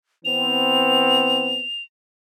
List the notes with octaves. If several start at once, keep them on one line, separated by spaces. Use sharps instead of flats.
E3 B3 C4 F7